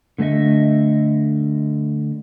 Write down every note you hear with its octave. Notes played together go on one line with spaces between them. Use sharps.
D3 A3 G#4 D#5 E5